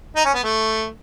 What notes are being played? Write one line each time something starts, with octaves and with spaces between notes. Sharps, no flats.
D#4
C#4
B3
A3